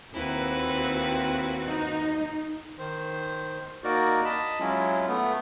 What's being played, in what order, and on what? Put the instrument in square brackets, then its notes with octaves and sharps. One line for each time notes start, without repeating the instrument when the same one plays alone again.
[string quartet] D#2 F#4 [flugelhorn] C4 [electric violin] E4 B4
[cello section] D#4
[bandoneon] D#3 C5
A#3 D#4 F#4 A#4 D5
D#5 A5 B5
F#3 G#3 C#4 E4 F4
A3 B3